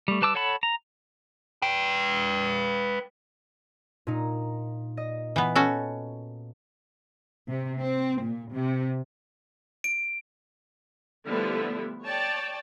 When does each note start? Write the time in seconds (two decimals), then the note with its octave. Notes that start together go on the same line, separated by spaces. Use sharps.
0.08 G3 A3
0.22 G3 B4 A5 D6 E6
0.35 A4 C#5 F#5 A5 B5
0.63 A#5
1.62 B4 G5
4.07 A#2 D#4
4.97 D#5
5.36 E3 B3
5.55 C#4 F#4 A4
7.49 C3
7.82 C4
8.22 A#2
8.53 C3
9.84 D7
11.26 D3 F3 G3 A3 B3 E4
12.05 C#5 D5 G5 A5